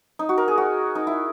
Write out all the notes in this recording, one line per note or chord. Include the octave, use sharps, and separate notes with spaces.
D#4
F#4
A#4
G#4
F#4
D#4
E4